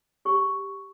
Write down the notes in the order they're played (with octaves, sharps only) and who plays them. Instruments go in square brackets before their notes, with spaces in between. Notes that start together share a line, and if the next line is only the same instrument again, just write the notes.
[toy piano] G4 C#6